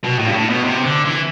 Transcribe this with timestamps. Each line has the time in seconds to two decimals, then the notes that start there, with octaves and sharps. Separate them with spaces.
0.04 B2
0.19 A2
0.27 G2
0.34 A2
0.50 B2
0.65 C3
0.84 D3
1.05 E3